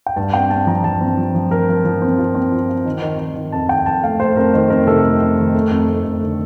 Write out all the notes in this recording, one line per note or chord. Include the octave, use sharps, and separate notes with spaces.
G5
G2 A5
C4 G5
C4 A5
F3 A#5
F3 A5
C4
F3
F3
F3 A#4
F3
F3
C4
F4
C4
F4
F4
D#3
D#3
D#3
D#3
F2 A5
D#3 G5
F2 A5
A3 F5
A3 C5
F2 A#4
D#3 C5
F2 A#4
C3 A4
A3
F2
D#3
A3
F2
A3
F2
D3